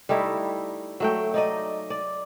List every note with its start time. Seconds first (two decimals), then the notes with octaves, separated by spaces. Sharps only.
0.09 G3 A3 D#4 E4
1.00 F#3 A3 G5
1.34 D#4 D5 D#5
1.90 D5